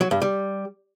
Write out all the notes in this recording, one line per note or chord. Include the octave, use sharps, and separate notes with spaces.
F#3
G2
G3